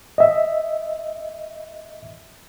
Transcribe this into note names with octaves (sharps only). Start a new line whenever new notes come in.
D#5 E5